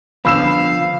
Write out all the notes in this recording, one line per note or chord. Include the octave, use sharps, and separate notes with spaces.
D3 F3 B3 F5 B5 E6 E7